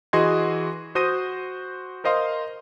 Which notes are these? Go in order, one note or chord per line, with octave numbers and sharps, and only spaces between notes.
E3 F#4 G#4 D#5 C6 G#6
F#4 C5 D#6 G6 A#6 D#7
A#4 C5 D#5 F5 C6